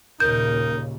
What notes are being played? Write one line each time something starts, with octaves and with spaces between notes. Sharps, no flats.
D#2 A#2 C#3 D#4 A#4 G6